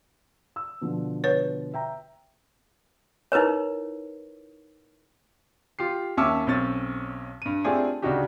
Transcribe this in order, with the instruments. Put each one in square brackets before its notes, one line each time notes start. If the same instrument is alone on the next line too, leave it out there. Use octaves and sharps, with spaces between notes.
[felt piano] E6
B2 D3 F3
[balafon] B4 C#5
[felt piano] E5 G5 A#5
[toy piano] D#4 E4 A#4 B4 C#5
[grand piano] F4 G4 C7
D#2 C#4 E5 A5 D6 E6
B1 C4 C#4 A6
G2 D#7
A3 C4 D4 F4 G4 G#4
D2 C#3 D4 D#4 F#4 G4